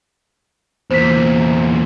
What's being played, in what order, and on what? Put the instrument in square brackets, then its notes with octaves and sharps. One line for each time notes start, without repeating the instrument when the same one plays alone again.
[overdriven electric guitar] E2 A#2 [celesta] C5 B6